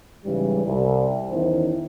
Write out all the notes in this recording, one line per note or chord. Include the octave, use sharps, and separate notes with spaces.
G#2 C#3 E3 G3
C2
E2 D#3 C#4 E4 C5